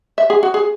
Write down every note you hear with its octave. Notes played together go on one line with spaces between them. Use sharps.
E5
G#4
F#4
G#4